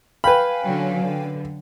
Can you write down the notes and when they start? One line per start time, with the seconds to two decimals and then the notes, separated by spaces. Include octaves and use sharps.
0.24 B4 F5 G5 G#5 B5
0.64 D3 F#3 C#4
1.04 D3